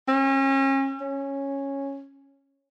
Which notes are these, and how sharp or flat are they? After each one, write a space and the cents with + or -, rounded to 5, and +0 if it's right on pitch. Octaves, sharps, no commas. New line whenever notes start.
C#4 -35
C#4 -10